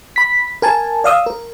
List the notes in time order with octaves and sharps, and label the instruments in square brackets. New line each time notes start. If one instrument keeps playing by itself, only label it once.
[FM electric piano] B5 B6
A#4 G#5 A5
D5 F5 D#6 E6
A#4